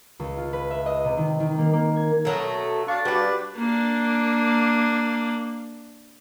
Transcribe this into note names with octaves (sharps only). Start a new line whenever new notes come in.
C#2
F4
B4
E5
D#5
C3
D#3
D#3
A#3
A#3
G#6
B2 F#3 A3 A#4
A4
D4 F5 C#6
G3 F#4 G4 B4 D5 C#6
A#3 D4